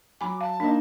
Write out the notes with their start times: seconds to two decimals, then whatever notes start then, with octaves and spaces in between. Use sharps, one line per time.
0.21 F#3 G#5 B5 D6
0.41 F5 A5
0.60 A#3 D4 D#4